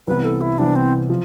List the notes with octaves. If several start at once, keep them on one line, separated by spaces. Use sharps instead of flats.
C2 C3 E3 B3 B4
A4
E4
C2 C3 E3 B3 D4
C4
F3